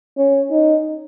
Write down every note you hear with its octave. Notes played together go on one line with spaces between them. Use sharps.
C#4
D#4